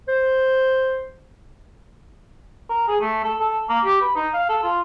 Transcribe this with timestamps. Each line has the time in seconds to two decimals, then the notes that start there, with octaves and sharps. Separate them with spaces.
0.08 C5
2.69 A#4
2.88 G#4
3.01 A3
3.24 A4
3.40 A4
3.69 A#3
3.85 G4
4.01 B4
4.16 D#4
4.33 F5
4.49 A4
4.63 F4